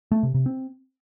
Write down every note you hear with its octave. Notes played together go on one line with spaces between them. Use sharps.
A3
C3
C3
C4